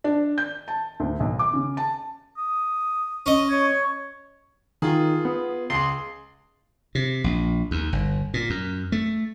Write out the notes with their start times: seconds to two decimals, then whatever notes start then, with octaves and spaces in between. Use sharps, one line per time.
0.04 D4
0.38 G6
0.68 A5
1.00 D2
1.20 B1
1.39 D6
1.54 C#3
1.77 A5
2.38 D#6
3.26 C#4 D#5
3.50 C#5
4.82 D#3 F4 G#4
5.25 B3
5.70 C#2 G#4 C6
6.95 C3
7.24 A#1
7.71 D#2
7.92 G1
8.34 A#2
8.50 F#2
8.92 A3